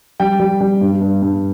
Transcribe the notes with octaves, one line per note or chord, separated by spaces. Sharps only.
G3 G5
G3
G3
G2
G2
G2